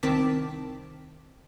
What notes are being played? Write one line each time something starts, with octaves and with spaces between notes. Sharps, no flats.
C2 D#3 C4 A5 D6 B6